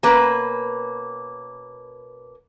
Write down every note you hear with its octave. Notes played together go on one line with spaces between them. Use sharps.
B2 A#3 C#4 B4